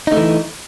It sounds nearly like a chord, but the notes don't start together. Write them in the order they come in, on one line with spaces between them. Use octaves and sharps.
D#4 A3 E3